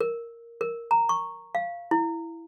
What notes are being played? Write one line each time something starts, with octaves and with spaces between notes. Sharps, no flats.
A#4
A#4
A#5
C#6
F5
E4